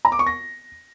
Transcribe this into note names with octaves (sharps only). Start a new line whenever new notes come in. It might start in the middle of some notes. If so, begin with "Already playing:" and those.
A#5
D6
C#6
A#6